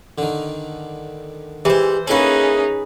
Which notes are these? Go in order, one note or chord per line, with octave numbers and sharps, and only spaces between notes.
D3 D#3
E3 G3 G#3 C5
A#3 C#4 D#4 E4 G#4 A4 B4